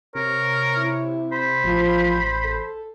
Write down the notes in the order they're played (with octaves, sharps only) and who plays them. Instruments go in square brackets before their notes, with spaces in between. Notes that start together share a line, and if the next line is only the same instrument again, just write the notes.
[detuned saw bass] C3 [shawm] A#4 [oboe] C#5
[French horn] E4
[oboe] C5 [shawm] B5
[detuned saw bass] A1 [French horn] F3
[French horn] A4